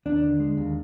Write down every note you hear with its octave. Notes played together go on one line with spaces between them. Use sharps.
D#2 D4
D3
G#3
D#2